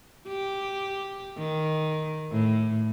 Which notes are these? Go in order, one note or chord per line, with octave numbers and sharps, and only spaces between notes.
G4
D#3
A2